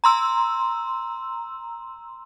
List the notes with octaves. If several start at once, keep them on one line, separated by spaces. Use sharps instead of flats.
A#5 C6 E6